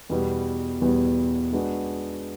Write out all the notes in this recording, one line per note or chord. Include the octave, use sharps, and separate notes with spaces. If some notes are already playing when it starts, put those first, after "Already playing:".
E2 B2 G3
E2 B2 G3
G#3 B3 D4 F#4